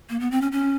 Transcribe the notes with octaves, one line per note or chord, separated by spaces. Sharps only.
A#3
B3
C4
C#4
C#4